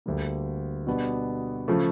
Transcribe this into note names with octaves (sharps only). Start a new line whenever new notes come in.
D2 D3 G3 A#3
B2 G3 B3 D4
C#3 F3 A3